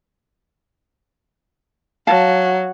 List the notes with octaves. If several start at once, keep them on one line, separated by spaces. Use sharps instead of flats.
F#3 F5 A5